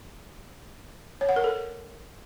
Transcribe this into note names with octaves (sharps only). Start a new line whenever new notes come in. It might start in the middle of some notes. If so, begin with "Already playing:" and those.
C#5
F#5
A#4
A4